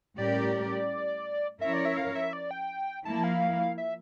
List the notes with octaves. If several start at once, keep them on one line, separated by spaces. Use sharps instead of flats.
A2 G3 C#4 G4 A#4 D5
F3 C#4 E4 A#4 C#5 E5
D5
E5
F5
E5
D5
G5
F3 A#3 E4 A5
F5
E5